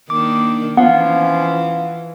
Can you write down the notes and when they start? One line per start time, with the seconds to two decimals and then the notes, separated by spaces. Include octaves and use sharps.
0.10 D#3 A#3 D4 D6
0.77 E3 F3 B3 C#4 F4 F5 F#5